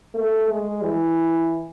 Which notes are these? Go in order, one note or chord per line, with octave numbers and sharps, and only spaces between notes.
A3
G#3
E3